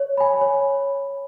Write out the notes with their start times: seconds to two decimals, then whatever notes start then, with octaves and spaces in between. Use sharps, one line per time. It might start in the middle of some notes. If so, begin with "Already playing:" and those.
Already playing: C#5
0.17 G#5 B5
0.41 C#5